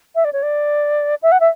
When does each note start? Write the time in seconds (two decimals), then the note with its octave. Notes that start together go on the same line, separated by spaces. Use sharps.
0.15 E5
0.25 D5
0.33 C#5
0.43 D5
1.23 E5
1.32 F#5
1.40 E5